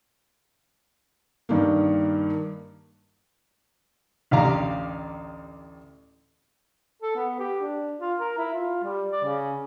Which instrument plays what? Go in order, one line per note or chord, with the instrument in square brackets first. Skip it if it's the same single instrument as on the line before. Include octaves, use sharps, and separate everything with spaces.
[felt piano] G2 D#3 A#3
[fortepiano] A1 D2 G4 F5 A#5
[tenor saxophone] A4
B3
G4
D4
F4
A#4
E4
F4
G3
D5
C#3